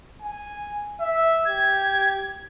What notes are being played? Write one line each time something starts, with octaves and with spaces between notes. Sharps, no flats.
G#5
E5
G4 G#6